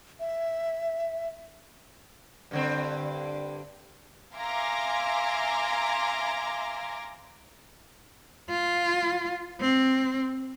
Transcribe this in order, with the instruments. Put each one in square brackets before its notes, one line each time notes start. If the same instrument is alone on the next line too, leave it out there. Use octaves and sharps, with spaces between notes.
[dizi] E5
[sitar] G2 D3 C4
[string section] E5 F5 G#5 A#5 C6 D6
[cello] F4
C4